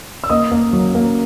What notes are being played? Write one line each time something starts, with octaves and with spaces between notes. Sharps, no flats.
E6
A#3 D#5 D#6
A#3
F#3
A#3